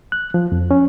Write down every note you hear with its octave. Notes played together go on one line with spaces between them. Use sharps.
F#6
F3
F2
C#4